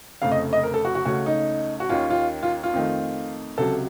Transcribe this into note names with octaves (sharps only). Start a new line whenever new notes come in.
F1 F2 C#3 A3 F5
D#5
D#5
A#4
A4
F#4
F#4
C#2 C#3 A3 C#4 F#4
D#4
F#4
D#2 D#3 A#3 C#4 F4
F4
F4
F4
F2 D#3 A3
C#2 C3 F#3 A4